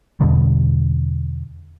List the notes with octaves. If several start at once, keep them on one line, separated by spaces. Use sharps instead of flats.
E2 B2 D3 G3